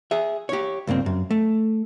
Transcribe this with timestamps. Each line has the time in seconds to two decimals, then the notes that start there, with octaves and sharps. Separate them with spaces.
0.11 G#4 E5
0.49 G4 C#5
0.87 C#2 G2 A#3 C4
1.06 F#2
1.31 A3